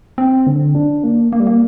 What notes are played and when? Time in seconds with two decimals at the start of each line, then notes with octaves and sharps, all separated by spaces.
0.18 C4
0.47 D3
0.75 D4
1.04 A#3
1.33 A#3
1.40 G3
1.47 A#3